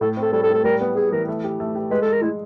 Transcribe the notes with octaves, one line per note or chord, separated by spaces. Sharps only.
A2 A4
C4
A4
G3 A4
A4
A2
A4
G3 A#4
B3
B3 G#4
E3 A#4
A3
G4
A3
G4
G#3 B4
A4
G#3
A#4
G#3 E4